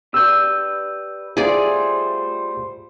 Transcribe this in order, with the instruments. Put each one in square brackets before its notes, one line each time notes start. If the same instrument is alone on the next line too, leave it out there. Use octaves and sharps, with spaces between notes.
[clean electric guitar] G4 B4 D5 [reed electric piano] E6 G6
[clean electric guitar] G3 A3 F4 [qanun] G#4 D5 [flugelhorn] C5